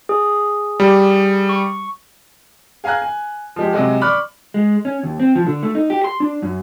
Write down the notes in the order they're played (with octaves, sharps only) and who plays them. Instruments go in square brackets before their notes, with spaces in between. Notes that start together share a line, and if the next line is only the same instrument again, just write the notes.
[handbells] G#4
[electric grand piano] G3
[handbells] C#6
[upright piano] G#4 F5 G#5 A#5 F#6
G#5
F3 G#3 G4
C3 F#3 G#3 F#4
D5 B5 C#6 D6 F6 F#6
[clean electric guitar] G#3
C#4
D#2
C4
F3
D3
A3
D#4
G4
C6
D4
F#2